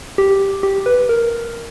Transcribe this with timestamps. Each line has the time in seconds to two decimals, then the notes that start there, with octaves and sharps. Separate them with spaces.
0.18 G4
0.63 G4
0.86 B4
1.09 A#4